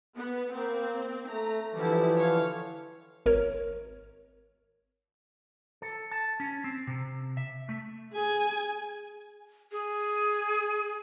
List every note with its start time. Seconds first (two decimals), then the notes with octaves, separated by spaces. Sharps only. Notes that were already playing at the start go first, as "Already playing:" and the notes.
0.16 B3
0.53 A#3 C4
1.29 A3 A#5
1.75 D3 E3 F3 G3 E4
2.17 C#5 F5
3.26 G#1 A#4 C#5
5.82 A4
6.11 A5
6.40 C#4
6.64 C4
6.87 C3
7.37 E5
7.69 A3
8.13 G#4 G#5
9.72 G#4